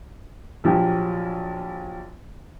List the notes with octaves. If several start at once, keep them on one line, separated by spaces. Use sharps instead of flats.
A#1 F3 F#3 G4